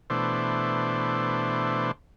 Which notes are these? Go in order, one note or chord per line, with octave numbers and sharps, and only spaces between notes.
B2 E3 A3 D4 C5